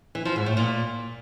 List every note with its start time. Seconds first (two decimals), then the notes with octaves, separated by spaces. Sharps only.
0.15 E3
0.25 F3
0.36 G#2
0.46 A2
0.57 A#2